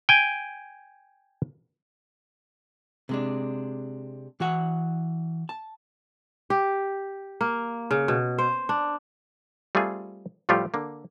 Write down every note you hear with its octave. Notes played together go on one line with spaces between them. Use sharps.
G5 G#5
C3 G#3 D4
E3 F#4 F#5
A5
G4
A#3
C#3
B2
C5
D4
G3 A3 C4 F4 G#4
A2 F3 G3 A3 F4 G4
D3 A#3